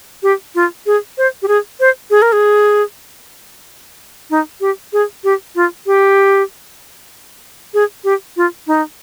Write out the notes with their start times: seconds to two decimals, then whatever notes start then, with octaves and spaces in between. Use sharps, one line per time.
0.23 G4
0.55 F4
0.86 G#4
1.18 C5
1.42 G4
1.48 G#4
1.80 C5
2.10 G#4
2.22 A#4
2.32 G#4
4.30 D#4
4.61 G4
4.93 G#4
5.24 G4
5.55 F4
5.86 G4
7.74 G#4
8.04 G4
8.37 F4
8.67 D#4